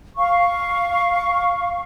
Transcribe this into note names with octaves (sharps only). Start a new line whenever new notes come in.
F5 C#6